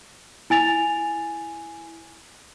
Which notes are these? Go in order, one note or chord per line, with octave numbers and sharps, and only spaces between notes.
E4 G#5 A6 F7